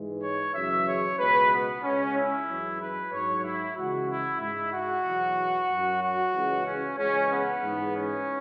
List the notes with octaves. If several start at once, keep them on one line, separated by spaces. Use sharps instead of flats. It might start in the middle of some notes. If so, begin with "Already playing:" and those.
Already playing: G#2 E3 G#3
C#5
F#2 C#3 E3 G#3 E5
C#5
C#2 B2 G#3 B4
B3
C#2 C#3 G#3 C#4
E4
F#2 E3 G#3
B4
G#2 F#3 C#5
E4
C#2 C#3 E3 G#3 F#4
E4
G#2 G#3 E4
F#4
E2 B2 F#3
F#2 F#3
F#4
C#2 C#3 E3 G#3
C#4
C#2 C#3 E3 G#3 C#4
B3
G#2 E3 G#3
C#4